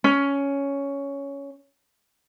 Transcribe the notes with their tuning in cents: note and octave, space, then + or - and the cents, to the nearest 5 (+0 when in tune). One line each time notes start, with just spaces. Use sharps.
C#4 +10